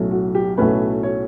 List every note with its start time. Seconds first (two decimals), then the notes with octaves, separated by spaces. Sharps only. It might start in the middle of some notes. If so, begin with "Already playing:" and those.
Already playing: B1 A2 F#3 A3 C#4
0.11 F#4
0.35 G4
0.57 B1 A2 F#3 A3 C#4 B4
1.03 C#5